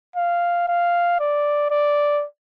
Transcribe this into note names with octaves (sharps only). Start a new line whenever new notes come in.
F5
F5
D5
D5